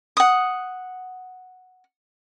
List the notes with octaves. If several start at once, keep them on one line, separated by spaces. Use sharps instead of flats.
F#5 D#6